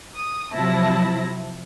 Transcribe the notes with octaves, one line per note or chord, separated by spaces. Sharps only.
D#6
C3 F3 F#3 E4 A5 A#6